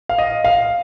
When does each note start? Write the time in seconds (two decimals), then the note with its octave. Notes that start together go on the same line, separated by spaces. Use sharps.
0.09 F5
0.18 D#5
0.45 F5